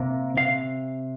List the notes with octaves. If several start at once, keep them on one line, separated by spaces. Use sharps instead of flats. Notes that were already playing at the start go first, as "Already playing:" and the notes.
Already playing: C3 A#3
C3 F5